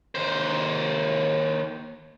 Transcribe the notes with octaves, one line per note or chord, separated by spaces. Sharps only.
D#2 C5